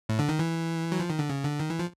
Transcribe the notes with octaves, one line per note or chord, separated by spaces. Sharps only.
A2
D3
D#3
E3
F#3
F3
D#3
D3
C#3
D3
D#3
E3
F3